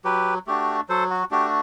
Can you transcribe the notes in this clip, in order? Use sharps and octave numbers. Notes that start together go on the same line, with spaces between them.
F#3 G4 B4
A3 D4 F#4 G4
F#3 A4 C5
F#4
A3 D4 F#4 G4